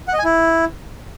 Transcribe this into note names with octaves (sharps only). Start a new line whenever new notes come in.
F#5
D#5
G#5
E4